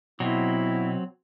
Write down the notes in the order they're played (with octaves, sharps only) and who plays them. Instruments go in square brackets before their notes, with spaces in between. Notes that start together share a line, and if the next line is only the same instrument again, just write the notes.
[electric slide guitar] B2 [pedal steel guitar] F#3 C4 [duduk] E4